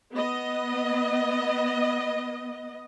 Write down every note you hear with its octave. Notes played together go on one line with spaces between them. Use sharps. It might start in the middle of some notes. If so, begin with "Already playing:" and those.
B3 D#5